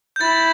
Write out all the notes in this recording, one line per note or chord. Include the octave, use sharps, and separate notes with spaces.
G6
E4 A6